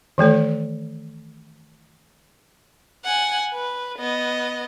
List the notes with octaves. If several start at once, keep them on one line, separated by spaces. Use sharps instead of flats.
D#3 E3 A3 A4
F#5 G#5
B4
B3 D#5